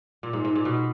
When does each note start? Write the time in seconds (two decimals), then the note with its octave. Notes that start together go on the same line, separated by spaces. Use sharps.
0.23 A#2
0.33 G#2
0.45 G#2
0.55 A#2
0.65 B2